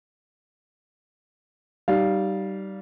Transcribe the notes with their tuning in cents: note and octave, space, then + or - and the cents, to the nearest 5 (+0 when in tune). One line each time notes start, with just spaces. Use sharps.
G3 -20 D#4 -10 F5 +0